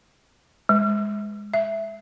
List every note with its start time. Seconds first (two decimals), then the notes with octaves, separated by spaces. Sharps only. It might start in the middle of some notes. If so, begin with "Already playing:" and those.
0.69 G#3
1.54 E5